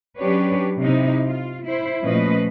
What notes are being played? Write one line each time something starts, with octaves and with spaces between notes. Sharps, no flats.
F#3 C#4 D4 G4 B4 C#5
C3 D#4 E4
F4
E4 C5
A#2 F3 A3 C#4 B4 D#5